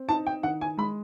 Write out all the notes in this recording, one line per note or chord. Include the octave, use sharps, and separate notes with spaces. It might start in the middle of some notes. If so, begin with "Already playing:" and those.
Already playing: C4
D#4 A5
G5
D#3 F#5
G#5
G#3 B5